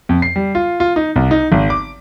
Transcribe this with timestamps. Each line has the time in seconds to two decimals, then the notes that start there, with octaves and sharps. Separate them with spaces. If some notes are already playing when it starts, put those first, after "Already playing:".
0.09 F2
0.22 C7
0.36 G3
0.55 F4
0.80 F4
0.96 D#4
1.16 C2
1.31 D#4
1.52 G#1
1.70 D6